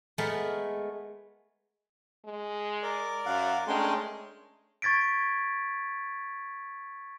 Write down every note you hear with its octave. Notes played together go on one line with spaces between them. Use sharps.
G#3 A3 B3 A#4
G#3
A#4 D5
F#2 F5 F#5
G#3 A3 C#4 D4 A#4 G5 C6
C#6 G#6 A6 B6 D7